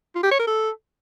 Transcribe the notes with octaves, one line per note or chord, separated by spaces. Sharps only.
F4
G4
C#5
A#4
A4